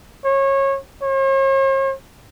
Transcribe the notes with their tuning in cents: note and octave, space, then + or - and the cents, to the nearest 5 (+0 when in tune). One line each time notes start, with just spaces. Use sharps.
C#5 -25
C#5 -45